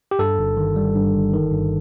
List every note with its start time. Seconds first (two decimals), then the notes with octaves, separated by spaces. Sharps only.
0.11 G4
0.19 G2 A4
0.38 G1
0.57 D#3
0.76 G3
0.95 G2
1.15 G1
1.33 D#3
1.52 G2